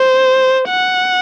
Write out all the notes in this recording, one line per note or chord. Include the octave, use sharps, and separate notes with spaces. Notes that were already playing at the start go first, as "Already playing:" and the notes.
Already playing: C5
F#5